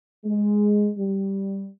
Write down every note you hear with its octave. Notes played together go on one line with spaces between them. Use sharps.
G#3
G3